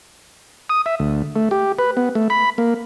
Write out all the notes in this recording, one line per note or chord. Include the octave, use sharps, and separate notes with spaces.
D#6
E5
D2
A3
G4
B4
B3
A3
B5
A#3